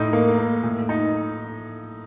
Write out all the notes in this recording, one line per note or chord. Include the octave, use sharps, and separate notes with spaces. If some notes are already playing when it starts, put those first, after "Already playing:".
Already playing: A2 D#4
A#3
A#3
A2
D#4